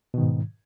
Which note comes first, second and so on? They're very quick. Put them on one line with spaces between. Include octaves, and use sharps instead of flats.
B2 D#3 G#2